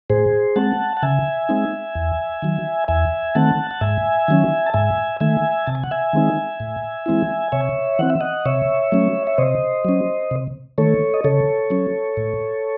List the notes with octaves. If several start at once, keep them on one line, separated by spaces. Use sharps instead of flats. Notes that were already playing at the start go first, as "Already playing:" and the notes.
A2 G#4 C5
G#3 C4 F#5 A5
F#5
C#3 E5 G#5
G#3 C4 D#4
E2
D#3 F#3
E2 E5 G#5
D#3 A3 C4 F#5 A5
F#5
G#2 E5 G#5
D#3 F#3 C#4
A5
G#2 E5 G#5
D#3 A3 E5 G#5
C3 A5
G#5
F#5
E5 G#5
D#3 G#3 C4 D#4
A2
E3 G#3 C4 E4
C3 C#5 E5
E3 C4 F#5
E5
D#5 F#5
C3 C#5 E5
F#3 A3 C#4
E5
C3 C5 D#5
F#3 C#4
C3
D#3 A3 A4 C#5
D#5
C#3 A4 C#5
F#3 C#4
A2